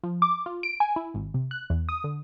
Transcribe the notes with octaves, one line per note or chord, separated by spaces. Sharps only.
F3
D6
F4
D7
G#5
E4
G#1
C3
F#6
E2
D#6
D3